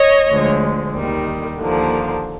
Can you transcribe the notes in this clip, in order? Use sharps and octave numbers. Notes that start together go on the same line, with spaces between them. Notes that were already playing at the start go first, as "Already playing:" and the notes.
Already playing: C#5 D#5
D2 D3 F3 G#3
D#2 D#3 G3
D#2 D3 F3 A#3